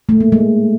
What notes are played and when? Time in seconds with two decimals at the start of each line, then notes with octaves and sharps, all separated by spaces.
0.09 A3
0.20 A#3
0.32 G#3